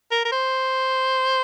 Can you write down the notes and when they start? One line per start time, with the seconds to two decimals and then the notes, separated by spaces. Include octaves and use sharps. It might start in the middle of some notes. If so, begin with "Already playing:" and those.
0.12 A#4
0.25 A#4
0.32 C5